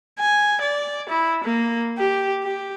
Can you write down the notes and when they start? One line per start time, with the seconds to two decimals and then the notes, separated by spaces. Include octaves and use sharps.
0.19 G#5
0.61 D5
1.09 E4
1.44 A#3
1.98 G4
2.43 G4